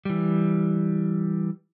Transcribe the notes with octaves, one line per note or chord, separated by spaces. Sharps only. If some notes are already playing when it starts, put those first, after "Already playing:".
E3 G3